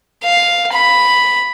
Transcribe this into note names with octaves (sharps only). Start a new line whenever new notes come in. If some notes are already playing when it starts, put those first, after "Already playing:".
F5
B5